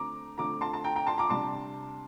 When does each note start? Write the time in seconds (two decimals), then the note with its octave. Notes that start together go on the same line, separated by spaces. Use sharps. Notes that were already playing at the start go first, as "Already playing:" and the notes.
Already playing: D3 A3 C4 A#5 D6
0.38 D3 A3 C4 A#5 D6
0.61 A5 C6
0.73 A5
0.84 G5 A#5
0.96 G5 A#5
1.07 A5 C6
1.18 A#5 D6
1.29 C3 G3 D4 A5 C6